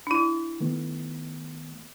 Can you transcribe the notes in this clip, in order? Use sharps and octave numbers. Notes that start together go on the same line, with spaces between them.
D4 E4
D#3 A3 B3